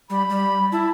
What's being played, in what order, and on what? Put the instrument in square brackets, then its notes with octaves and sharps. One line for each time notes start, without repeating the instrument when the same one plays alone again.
[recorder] G3 [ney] B5
[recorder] G3
[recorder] E4 [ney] A5